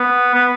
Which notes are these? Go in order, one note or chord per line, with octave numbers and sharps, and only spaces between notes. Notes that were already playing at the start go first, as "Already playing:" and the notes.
Already playing: B3
B3